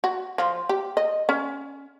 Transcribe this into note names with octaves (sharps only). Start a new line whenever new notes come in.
F#4
F3
G4
D#5
C#4